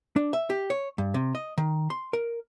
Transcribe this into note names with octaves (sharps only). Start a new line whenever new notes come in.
D4
E5
G4
C#5
G2
C3
D#5
D#3
C6
A#4